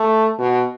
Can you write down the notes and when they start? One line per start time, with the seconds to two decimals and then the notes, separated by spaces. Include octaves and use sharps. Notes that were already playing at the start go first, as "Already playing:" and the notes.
Already playing: A3
0.39 B2